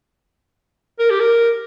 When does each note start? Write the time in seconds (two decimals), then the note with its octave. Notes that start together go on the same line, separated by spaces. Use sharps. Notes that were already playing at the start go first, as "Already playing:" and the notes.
0.99 A#4
1.10 G4
1.20 A#4